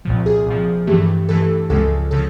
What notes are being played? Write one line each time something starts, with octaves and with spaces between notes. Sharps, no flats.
C2 A#2 F3
G#4
C2 A#2 F3
G2 E3 A3 G4
G2 E3 A3 A4
C#2 C#3 F3 G#3 A4
C#3 F3 A4